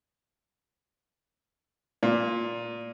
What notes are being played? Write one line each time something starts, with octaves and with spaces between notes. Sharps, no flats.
A#2